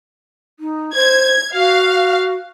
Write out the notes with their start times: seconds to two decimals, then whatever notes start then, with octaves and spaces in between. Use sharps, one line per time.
0.59 D#4
0.94 C5 G#6
1.53 F#4 F5